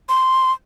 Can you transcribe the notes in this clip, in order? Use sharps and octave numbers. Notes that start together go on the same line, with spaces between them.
C6